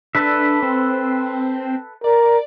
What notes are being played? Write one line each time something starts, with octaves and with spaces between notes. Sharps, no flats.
D4 A4 B4 E5
C4
A#4 D5